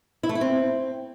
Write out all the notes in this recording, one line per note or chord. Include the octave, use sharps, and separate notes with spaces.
E4
A3
E4
C4